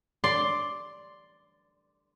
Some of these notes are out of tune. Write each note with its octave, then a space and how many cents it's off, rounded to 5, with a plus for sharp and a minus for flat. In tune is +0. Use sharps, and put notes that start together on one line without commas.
D5 +0 C6 +0